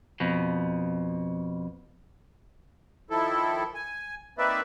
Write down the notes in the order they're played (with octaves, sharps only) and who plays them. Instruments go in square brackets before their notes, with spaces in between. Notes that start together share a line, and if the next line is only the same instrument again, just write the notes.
[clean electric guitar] F2 B2
[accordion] D#3 F3 E4 A4
G#5
A#3 C4 D#4 B4 D5 E5